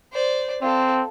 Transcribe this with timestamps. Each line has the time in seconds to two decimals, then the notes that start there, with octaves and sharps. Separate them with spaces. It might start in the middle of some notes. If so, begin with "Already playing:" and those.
0.12 C5 D5
0.62 C4 F4 A4